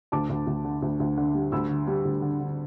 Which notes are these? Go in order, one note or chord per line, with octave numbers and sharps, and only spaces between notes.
D2 A5 D6
D2
D2
D3
D2
D2
D3
G3
D2 B5 E6
D3
G3
D2
D3
D3